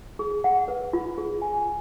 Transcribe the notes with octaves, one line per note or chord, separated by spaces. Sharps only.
G#4
F#5
B4
F4
G#4
G#5